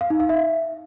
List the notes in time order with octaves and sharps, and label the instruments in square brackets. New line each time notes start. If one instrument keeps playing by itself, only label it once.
[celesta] F5
D#4
F5
E5